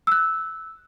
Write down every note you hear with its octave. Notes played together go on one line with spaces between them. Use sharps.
E6 F#6